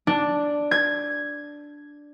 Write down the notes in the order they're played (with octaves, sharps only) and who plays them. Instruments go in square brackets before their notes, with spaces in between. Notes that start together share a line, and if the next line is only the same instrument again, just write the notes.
[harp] D4
G#6